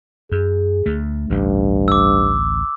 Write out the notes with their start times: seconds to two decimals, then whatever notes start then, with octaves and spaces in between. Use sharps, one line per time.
0.32 F#2 G#4
0.86 D2 A3
1.30 A1 D2 G2
1.88 D6 E6